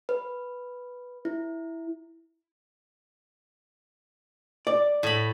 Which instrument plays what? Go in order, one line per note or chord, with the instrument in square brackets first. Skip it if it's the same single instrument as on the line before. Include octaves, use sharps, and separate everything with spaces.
[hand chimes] B4
E4
[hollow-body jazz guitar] D5
[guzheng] A2 B5